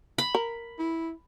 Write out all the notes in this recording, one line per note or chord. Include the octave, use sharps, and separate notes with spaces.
B5
A#4
E4